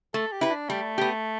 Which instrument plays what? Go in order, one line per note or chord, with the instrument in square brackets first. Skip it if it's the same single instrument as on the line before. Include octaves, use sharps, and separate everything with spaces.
[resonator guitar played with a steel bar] A3 [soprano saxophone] A4
[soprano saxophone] G4
[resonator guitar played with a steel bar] E4 B4
[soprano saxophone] D4
[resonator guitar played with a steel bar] G3 [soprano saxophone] A3
[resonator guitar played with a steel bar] B3 G4